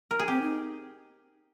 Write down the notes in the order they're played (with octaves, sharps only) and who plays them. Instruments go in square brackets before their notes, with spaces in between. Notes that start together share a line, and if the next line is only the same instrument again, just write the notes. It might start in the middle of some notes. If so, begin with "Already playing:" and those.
[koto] A#4
G#4
[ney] C4 [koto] G4
[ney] D#4